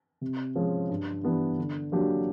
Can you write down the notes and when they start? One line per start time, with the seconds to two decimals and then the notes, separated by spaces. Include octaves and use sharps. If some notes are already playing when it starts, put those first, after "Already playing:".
0.21 C3
0.55 F3 G#3 C#4
0.89 G2
1.23 E3 G3 B3 D4
1.58 D3
1.92 F#3 A#3 D4 G4